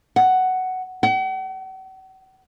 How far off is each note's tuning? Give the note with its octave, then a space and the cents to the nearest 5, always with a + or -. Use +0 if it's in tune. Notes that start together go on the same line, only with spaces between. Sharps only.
F#5 +10
F#5 +45